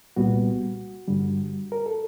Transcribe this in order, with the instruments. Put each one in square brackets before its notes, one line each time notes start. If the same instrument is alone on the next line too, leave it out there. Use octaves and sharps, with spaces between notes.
[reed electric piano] C2 A#2 G3 B3 F#4
G2 D3 G3
A#4
A4